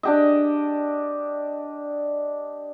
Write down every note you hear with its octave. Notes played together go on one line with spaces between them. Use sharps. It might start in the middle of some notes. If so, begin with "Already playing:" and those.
D4 G4 D#5